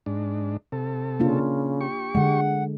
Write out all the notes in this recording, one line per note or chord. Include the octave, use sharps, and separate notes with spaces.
G#2 D4
C3 A4
C#3 A#3 D4 F4
G4 C#6
D3 G#3 F#5